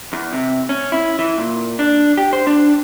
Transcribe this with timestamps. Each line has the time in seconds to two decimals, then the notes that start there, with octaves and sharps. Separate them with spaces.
0.13 E2
0.33 C3
0.69 C#4
0.92 E4
1.19 E3
1.38 A#2
1.79 D4
2.18 G4
2.33 C5
2.47 D4